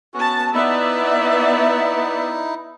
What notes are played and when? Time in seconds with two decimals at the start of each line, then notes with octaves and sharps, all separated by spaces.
0.14 B3 C#4 F#4 A5
0.53 B3 D#4 E4 D5 E5